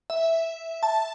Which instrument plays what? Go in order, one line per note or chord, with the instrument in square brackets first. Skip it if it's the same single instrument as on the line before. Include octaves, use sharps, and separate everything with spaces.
[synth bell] E5
A5